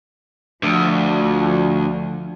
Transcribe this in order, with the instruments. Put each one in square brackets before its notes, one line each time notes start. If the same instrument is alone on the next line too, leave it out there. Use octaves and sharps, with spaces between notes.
[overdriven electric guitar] D2 [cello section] F3